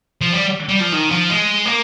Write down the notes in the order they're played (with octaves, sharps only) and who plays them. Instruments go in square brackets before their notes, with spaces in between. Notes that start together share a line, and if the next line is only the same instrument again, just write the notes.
[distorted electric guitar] F3
G3
G3
F3
D#3
F3
G#3
A#3